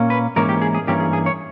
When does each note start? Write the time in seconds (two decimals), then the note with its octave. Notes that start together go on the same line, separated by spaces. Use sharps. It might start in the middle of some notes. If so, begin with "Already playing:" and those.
Already playing: A#2 A#3 C#4
0.10 B4
0.36 G#2 E3 A#3 C#4 A#4
0.49 G4
0.62 G#4
0.75 G#4
0.87 G2 E3 A#3 C#4 G4
1.00 G#4
1.13 G#4
1.26 C#5